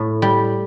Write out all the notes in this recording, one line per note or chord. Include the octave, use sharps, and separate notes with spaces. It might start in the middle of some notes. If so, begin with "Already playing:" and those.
Already playing: A2
G3